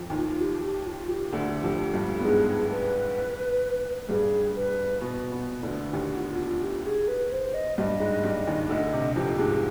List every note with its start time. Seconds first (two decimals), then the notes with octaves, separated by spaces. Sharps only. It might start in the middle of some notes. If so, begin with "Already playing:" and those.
Already playing: F2 F3
0.10 D#2 D#3
0.17 F4
0.41 G4
0.63 G4
0.87 F4
1.09 G4
1.32 D2 D3
1.63 F2 F3
1.94 G2 G3
2.19 B3
2.24 G#2 G#3 G#4
2.71 B4
4.09 G2 G3 G#4
4.56 B4
5.01 B2 B3
5.32 B2 B3
5.63 D2 D3
5.93 D#2 D#3 G4
6.17 F4
6.40 F4
6.62 G4
6.86 G#4
7.08 B4
7.32 C5
7.54 D#5
7.78 G2 G3 D#5
8.00 G#2 G#3
8.24 G2 G3
8.47 D#2 D#3
8.69 D2 D3 D#5
8.93 C3
9.16 F2 F3 G4
9.39 G#2 G#3